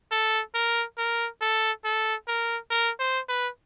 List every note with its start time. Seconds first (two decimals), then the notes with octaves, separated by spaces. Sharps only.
0.12 A4
0.55 A#4
0.98 A#4
1.41 A4
1.85 A4
2.28 A#4
2.71 A#4
3.00 C5
3.29 B4